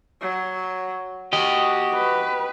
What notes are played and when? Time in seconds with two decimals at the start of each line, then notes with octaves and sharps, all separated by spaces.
0.21 F#3
1.33 F#4 G4 D#5
1.94 B4